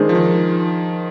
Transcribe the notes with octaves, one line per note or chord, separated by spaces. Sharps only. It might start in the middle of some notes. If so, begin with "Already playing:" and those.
Already playing: D#3 G#3 D4 G#4 C5
F3
D#3